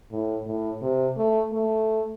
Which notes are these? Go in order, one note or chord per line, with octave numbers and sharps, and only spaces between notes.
A2
A2
C3
A3
A3